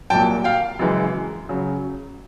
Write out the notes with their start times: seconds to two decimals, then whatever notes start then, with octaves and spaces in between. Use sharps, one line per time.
0.10 C2 A#2 F#3 G5 A5
0.44 F5 G5
0.79 F#2 C#3 E3 G#3
1.49 C#3 F#3